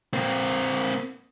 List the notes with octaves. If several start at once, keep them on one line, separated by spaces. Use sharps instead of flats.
A#3 C4